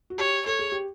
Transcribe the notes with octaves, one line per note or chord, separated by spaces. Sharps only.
F#4
G4 C#5
A4 C#5
G#4
G4